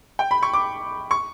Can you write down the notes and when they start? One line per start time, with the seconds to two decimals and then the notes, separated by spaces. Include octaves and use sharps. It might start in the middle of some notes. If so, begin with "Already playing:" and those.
0.19 G5
0.31 B5
0.43 C#6
0.53 D6
1.11 C#6